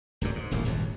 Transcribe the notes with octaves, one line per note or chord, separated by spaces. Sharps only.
D1 F#2 D3
G#2
D#1 A1 D2 A#3
D#1 G#1 F2